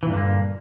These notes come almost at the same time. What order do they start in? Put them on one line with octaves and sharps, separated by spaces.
E3 A#2 G2 D3 A#3